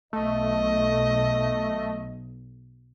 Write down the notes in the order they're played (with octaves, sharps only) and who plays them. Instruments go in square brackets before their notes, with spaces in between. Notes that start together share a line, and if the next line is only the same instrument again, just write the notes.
[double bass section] B1 [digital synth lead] A3 [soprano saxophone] D#5